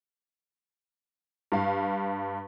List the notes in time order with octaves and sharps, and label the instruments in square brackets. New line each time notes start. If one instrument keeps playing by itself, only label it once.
[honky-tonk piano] G2 F5